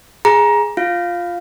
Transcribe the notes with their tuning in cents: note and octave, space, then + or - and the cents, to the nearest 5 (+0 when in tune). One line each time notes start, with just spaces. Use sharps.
G#4 +0 A#5 +20
F4 +0 F5 +0